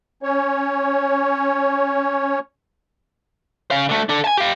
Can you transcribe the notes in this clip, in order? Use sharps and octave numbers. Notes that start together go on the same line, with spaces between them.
C#4 C#5
C#3 F5
D3 A3
D4 A4
G#5 A5
G4 F5